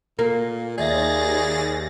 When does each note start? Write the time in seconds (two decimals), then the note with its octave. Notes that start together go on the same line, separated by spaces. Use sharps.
0.19 A#2 A#3
0.78 D#2 G#4 D5 E5 A6 A#6